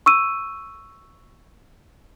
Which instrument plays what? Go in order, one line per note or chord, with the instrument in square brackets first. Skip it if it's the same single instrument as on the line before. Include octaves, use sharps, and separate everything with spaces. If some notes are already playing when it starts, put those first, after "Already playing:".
[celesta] C#6 E6 D#7